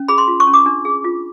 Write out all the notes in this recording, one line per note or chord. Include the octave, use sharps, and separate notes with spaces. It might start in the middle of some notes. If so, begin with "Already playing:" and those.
Already playing: C#4
G#4 B5
C6
F4
C#6
C#4
D6
D4
G#4
F4